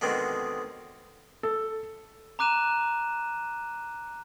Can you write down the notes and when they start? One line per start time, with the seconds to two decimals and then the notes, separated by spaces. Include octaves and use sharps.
0.01 B2 D3 D#3 G#3 C4
1.43 A4
2.39 A#5 D6 F#6 D#7 E7